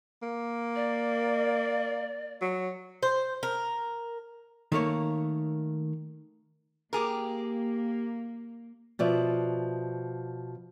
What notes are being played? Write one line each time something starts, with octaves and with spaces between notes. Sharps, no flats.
A#3
D5
F#3
C5
A#4
D#3 A3 A#3 C#5
A#3 G4 G#4 A#4
B2 F3 D5 E5